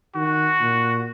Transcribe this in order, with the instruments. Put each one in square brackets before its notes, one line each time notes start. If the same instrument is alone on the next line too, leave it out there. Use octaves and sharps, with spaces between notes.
[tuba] D#3 [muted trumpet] F#4
[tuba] A#2